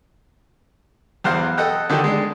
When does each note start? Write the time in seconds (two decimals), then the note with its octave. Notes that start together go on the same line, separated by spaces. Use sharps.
1.24 B1 E2 C5 F5 F#5
1.58 A4 D#5 F#5 G5
1.90 D3 D#3 F#3 G4 A4
2.04 G#3 D4